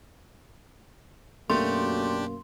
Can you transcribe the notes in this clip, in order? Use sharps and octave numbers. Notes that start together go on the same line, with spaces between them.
F#2 B2 A3 A#3 D4 G4 C6